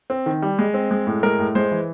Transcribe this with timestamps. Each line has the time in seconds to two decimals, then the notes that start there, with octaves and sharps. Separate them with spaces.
0.10 C4
0.26 D#3
0.42 G3
0.59 G#3
0.74 C4
0.91 G#3
1.07 A2
1.23 G#3 A#4
1.39 A2
1.55 G#3 C5
1.71 E3